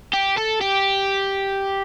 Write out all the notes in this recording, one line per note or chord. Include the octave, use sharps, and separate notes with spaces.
G4
A4
G4